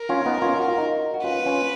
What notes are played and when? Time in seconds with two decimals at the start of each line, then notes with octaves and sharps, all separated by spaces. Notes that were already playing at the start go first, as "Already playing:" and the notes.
Already playing: A#4
0.09 C#4 F4
0.26 B3 D#4
0.42 C#4 F4
0.59 F#4
0.68 F4
0.78 D#4 F#4
1.14 F#4
1.24 C#4 F4 B4
1.46 C#4 F4